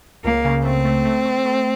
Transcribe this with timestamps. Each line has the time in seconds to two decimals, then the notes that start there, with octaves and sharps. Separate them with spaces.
0.24 C#2 A#3
0.45 C#3
0.65 A3 C4
0.85 A3
1.05 A3
1.25 A3
1.45 A3